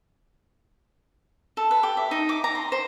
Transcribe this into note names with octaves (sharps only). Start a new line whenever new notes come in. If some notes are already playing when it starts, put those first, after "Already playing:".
A4
B4
G4
E5
D#4
D6
A#5
C6
C5